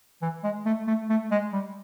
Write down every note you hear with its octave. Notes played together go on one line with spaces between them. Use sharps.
E3
G#3
A3
A3
A3
G#3
G3